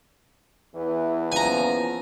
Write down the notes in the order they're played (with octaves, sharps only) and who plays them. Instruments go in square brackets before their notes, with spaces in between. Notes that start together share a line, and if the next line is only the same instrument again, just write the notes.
[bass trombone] E2 [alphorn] E3
[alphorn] F3 [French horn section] A#3 B3 C#4 [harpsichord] G#5 A#5